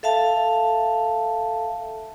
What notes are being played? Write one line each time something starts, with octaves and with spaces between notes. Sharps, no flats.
A4 E5 F5 A5